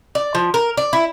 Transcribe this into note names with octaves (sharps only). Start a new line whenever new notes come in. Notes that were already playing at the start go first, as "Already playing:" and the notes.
D5
F3
A#4
D5
E4